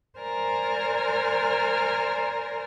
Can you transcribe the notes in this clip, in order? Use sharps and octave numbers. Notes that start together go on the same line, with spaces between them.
A#4 C5 D5 G#5 A#5 F6